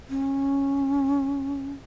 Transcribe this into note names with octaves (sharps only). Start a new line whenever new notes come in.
C#4